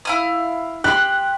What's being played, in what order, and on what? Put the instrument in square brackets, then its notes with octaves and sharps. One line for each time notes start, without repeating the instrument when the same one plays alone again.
[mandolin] E4 F5 D#6
[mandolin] G4 C6 [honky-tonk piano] F#6